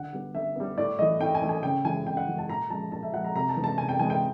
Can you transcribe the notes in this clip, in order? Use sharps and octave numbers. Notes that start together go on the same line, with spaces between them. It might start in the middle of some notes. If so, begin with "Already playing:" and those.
Already playing: D3 F#5
G3 B3
D3 E5
G3 B3
A2 D5
E3 A3 D#5
A2 G5
G#5
E3 A3
G#5
C#3 G5
E3 G#3 G#5
C#3 G5
F#5
E3 G#3
A5
A#2 A#5
F3 G#3 A5
A#2 A5
E5
F3 G#3 F#5
A#5
C3 A#5
A5
E3 G#3 B3
A5
C3 G#5
G5
E3 G#3 B3 G#5
G5